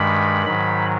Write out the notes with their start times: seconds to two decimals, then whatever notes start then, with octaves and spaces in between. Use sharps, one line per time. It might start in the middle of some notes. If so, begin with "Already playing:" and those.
Already playing: G2 D#3 G#3 B5
0.45 G#2 D#3 F#3 B5